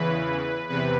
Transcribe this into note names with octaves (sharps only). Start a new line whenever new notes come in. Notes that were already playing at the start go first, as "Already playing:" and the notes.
Already playing: E2 C#3 E3 B4
E2 C3 B4